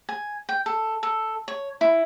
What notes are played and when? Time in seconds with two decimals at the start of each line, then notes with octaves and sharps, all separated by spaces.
0.09 G#5
0.49 G5
0.66 A4
1.03 A4
1.48 C#5
1.81 E4